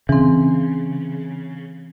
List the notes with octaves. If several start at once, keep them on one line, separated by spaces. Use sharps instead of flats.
C#3 E3 C4